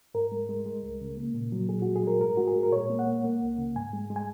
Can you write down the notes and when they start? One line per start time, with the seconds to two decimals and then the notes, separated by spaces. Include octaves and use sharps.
0.14 G#2 A#4
0.32 G#3
0.49 G#3
0.66 G#3
0.83 C#2
1.01 C#3
1.17 A#3
1.34 A#2
1.52 F#3
1.69 A#2 G#4
1.82 F#4
1.87 G#3
1.96 G#4
2.03 G#3 A#4
2.21 G#2 A#4
2.37 G#3 F#4
2.47 G#4
2.56 G#3
2.63 A#4
2.72 A#2 C#5
2.90 A#3
2.99 F#5
3.06 A#3
3.24 A#3
3.42 C#2
3.58 C#3
3.76 G#2 G#5
3.93 G#3
4.10 G#3
4.16 G#5